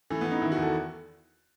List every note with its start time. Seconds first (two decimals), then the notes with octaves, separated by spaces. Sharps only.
0.10 E3 A3
0.21 B3
0.26 E3
0.31 D#4
0.42 D#3 E4
0.52 F#4
0.57 E2
0.62 A4